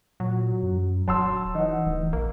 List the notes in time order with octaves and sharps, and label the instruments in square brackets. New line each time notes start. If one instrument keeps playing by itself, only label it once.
[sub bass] A#2 [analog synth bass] F#3
[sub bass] F#2
[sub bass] D#1 [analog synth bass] F#3 [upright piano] A5 C6 E6
[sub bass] E3 [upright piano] D#4 F#5
[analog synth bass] D1 [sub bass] E3
[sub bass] A#1 [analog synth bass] A#3